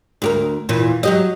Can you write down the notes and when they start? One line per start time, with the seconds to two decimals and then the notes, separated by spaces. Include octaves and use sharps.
0.22 D2 G4 A#4
0.69 E2 A#2 E3
1.03 F#3 G4 D#5